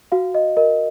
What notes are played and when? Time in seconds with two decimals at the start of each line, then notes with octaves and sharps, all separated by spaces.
0.12 F#4 F5
0.35 D#5
0.57 A#4 D#5